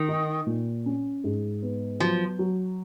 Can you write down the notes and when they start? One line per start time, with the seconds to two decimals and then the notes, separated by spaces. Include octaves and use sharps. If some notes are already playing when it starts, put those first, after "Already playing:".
Already playing: D#3
0.08 D#4
0.46 A#2
0.86 C#4
1.24 G#2
1.62 B3
2.00 F3 F#3
2.39 F#3